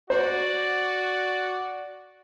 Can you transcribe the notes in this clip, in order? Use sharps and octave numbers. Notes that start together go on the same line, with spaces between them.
F#4 C5 D5